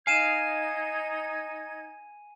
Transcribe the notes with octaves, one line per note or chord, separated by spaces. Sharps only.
D#4 F5 G#5 G#6 D#7 E7